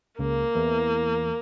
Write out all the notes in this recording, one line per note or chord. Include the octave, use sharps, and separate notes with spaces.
C#2 C#3 A#3
E2 E3